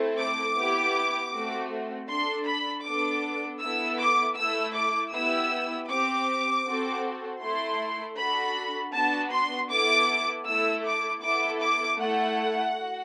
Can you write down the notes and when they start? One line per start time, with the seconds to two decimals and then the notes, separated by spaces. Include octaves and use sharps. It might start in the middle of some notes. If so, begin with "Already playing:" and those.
Already playing: A3 C4 E4 A4
0.18 D6
0.56 B3 E4 G4
1.32 A3 C4 F#4
2.08 D4 A4 C6
2.46 B5
2.84 B3 D4 A4 D6
3.60 B3 E4 A4 E6
3.99 D6
4.36 A3 E4 A4 E6
4.74 D6
5.12 B3 E4 G4 E6
5.89 C4 G4 D6
6.65 C4 F#4 A4
7.41 A3 E4 A4 C6
8.17 D4 F#4 A4 B5
8.93 B3 D4 F#4 A5
9.32 C6
9.69 B3 E4 A4 D6
10.46 A3 E4 A4 E6
10.83 D6
11.21 B3 E4 A4 D6
11.59 D6
11.98 A3 E4 A4 F#5
12.74 F#4